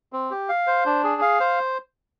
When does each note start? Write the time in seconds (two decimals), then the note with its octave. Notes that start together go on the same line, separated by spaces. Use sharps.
0.13 C4
0.31 G4
0.49 F5
0.67 C5
0.86 D4
1.04 G#4
1.22 F5
1.40 C5